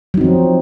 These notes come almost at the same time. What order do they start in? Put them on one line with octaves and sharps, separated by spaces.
F#3 D#4 C4 F3